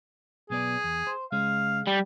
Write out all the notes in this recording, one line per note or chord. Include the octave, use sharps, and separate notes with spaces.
B1 B3 G#4 D5
E2
C5
C#2 G#3 C#4 F5
G3